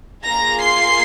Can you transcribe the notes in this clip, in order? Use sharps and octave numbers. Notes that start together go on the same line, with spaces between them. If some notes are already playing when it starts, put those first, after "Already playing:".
A#3 F4 G#4 A#5 A#6
C6 C7